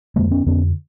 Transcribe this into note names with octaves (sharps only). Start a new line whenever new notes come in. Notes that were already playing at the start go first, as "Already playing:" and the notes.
F2 D3 G#3 A#3
B3 C#4
F2 D3 B3 C#4